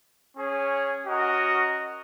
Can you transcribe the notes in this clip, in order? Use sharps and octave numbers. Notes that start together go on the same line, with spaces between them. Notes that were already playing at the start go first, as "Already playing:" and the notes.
C#4 G#4 C#5
C#4 F#4 A#4 D#5